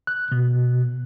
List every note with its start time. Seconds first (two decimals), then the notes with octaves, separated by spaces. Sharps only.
0.07 F#6
0.32 B2